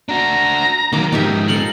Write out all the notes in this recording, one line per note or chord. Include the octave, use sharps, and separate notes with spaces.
D4 F#4 A#5
D#3 F#3 A#3 D6
G#2 F3 D#4 G4 E5
A4 A#4 F5 F#7